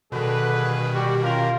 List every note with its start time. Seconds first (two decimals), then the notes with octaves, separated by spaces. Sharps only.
0.12 G2 B2 D3 D#3 G#4 B4
0.94 G3 F#4 G4
1.23 C#4 F4 G4 A#4